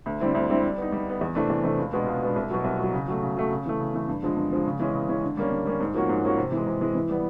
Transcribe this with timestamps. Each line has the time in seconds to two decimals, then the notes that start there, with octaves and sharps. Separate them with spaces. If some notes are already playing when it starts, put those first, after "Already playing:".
0.06 D2
0.20 D3 G3 C4 E4
0.35 D2
0.49 D3 G3 C4 E4
0.63 G3
0.78 B3 D#4
0.92 G3
1.06 B3 D#4
1.21 E2
1.35 C3 E3 A3 D4
1.50 E2
1.63 C3 E3 A3 D4
1.79 C#2
1.93 B2 G#3 B3 D4
2.07 C#2
2.22 B2 G#3 B3 D4
2.36 C2
2.51 B2 F#3
2.64 C2
2.78 B2 F#3
2.93 C#3
3.08 F#3 A3
3.22 C#3
3.37 F#3 A3
3.50 C#3
3.66 E3 A3
3.79 C#3
3.94 E3 A3
4.08 G2
4.23 D3 F3 G#3
4.37 G2
4.51 D3 F3 G#3
4.66 C#3
4.80 E3 G#3 C#4
4.95 C#3
5.09 E3 G#3 C#4
5.23 D3
5.37 G3 A#3 C#4
5.51 D3
5.65 G3 A#3 C#4
5.80 G#2
5.94 F3 A#3 C#4 F#4
6.09 G#2
6.24 F3 A#3 C#4 F#4
6.38 C3
6.52 E3 G#3
6.67 C3
6.81 E3 G#3
6.95 E3
7.09 G3 B3